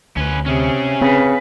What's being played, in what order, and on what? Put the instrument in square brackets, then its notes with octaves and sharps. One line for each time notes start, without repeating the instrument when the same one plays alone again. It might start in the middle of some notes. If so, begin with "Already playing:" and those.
[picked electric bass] D2 [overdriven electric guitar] C#4 B4
[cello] C3 [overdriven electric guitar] C#4 G#4
[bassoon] C#3 [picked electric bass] C4 [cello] B4